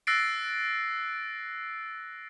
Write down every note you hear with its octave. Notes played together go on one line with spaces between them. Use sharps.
E6 F#6 A6 A#6 C7 D7